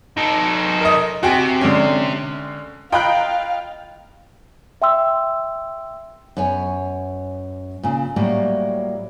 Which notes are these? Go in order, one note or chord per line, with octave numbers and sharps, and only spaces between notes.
D#4 A4
A#4 D#5
C3 F#4 G5 G#5
D3 G#3 C#4
F4 D#5 F5 G5 A#5 B5 F#6
E5 G5 C6 E6
F#2 B3 C#5 G#5
A#2 C#3
A2 F#3 G3 A#3